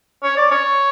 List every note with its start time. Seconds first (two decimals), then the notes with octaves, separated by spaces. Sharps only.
0.23 C#5
0.37 D5
0.51 C#5